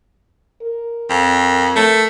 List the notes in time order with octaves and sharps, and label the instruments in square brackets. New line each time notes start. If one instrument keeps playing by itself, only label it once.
[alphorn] A#4
[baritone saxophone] F2
A3